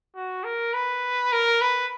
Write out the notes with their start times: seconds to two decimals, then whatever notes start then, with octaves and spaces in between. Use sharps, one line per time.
0.15 F#4
0.44 A#4
0.73 B4
1.32 A#4
1.61 B4